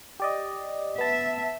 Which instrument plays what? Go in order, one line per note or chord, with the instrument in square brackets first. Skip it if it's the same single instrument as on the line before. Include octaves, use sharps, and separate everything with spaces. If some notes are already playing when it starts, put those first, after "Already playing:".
[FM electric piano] G4 D5 D#5
[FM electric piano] B3 A5 [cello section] E5